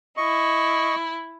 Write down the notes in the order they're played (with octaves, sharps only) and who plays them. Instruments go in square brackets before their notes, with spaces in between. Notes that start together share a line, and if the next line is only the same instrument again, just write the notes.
[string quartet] E4 [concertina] D#5 C#6